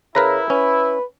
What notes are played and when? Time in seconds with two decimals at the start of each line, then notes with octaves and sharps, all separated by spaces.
0.15 C#3 E4 A#4 B4 A#5
0.50 C#4 B4